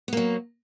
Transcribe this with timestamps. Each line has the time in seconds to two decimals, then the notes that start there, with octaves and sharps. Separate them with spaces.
0.08 B3
0.13 A#3
0.17 F#3